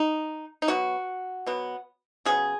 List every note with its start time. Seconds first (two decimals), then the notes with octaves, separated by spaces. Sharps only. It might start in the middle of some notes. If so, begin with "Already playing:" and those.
Already playing: D#4
0.62 D#4
0.68 B2 F#3 B3 F#4
1.46 B2 F#3 B3
2.25 C#3 F#3 B3 G#4